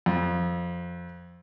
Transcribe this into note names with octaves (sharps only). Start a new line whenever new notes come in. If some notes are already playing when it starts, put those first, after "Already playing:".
F2